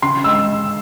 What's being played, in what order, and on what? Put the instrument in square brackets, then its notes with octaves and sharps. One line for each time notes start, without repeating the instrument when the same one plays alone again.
[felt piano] C#3 C6
G#3 E6